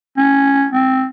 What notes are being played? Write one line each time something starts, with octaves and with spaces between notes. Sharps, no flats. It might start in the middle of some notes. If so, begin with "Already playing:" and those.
C#4
C4